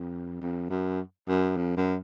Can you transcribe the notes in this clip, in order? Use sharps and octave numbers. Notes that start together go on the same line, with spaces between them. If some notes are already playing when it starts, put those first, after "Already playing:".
Already playing: F2
F2
F#2
F#2
F2
F#2